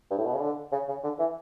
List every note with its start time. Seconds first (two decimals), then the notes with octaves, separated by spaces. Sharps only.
0.10 G2
0.17 A2
0.25 B2
0.34 C#3
0.41 D3
0.72 C#3
0.88 C#3
1.03 D3
1.19 E3